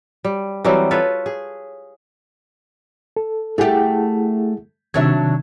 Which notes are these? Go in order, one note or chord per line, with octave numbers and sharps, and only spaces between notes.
G3
E3 F#3 G3 C4
F4 A4 B4 C#5
G#4
A4
A3 E4 G4 G#4 F#5
C3 D#3 F#3 D4 E5 G#6